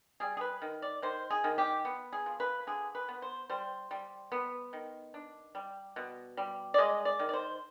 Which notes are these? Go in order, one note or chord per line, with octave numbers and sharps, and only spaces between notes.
G3 G#4
G#4
B4
D#3
D5
D#3 C5
G#4
D#3
G4
B3
G#4
F3
B4
D3 G#4
B4
B3
C5
G3 C5
G3
B3
D#3
D4
G3
B2
G3
D5
G#3 D#5
D5
D#3
D5
C5